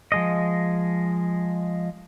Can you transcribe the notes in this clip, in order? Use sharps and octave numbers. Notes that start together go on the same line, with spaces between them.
F3 G#3 D#5